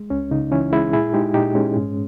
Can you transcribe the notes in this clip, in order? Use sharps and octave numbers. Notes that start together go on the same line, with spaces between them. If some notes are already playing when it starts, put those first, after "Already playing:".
Already playing: G#3
C#2 C#4
C#3 D#4
E3 C#4 E4
G#3 E4 G#4
A#2 E4 G#4
G#3 D#4 G4
A#2 D#4 G4
G#3 C#4
G#2